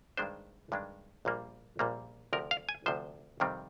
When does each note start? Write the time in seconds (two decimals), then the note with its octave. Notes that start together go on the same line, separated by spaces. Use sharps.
0.17 G2 D#3 G#3 D4 C5
0.72 G2 D#3 G#3 D4
1.25 A#1 A#2 G3 A#3
1.79 A#1 A#2 G3 A#3
2.33 D2 C3 F3 A#4
2.51 F5
2.69 G#5
2.86 D2 C3 F3 C5
3.40 F2 C3 D#3 G3 C4